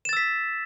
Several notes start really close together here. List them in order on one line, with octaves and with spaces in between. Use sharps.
E7 A6 E6 B6